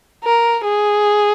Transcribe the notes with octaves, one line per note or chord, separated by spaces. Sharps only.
A#4
G#4